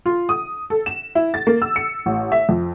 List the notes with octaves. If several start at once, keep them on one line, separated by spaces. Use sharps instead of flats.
F4
D#6
A4
E7
E4
A6
A#3
E6
C#7
A1
E5
F2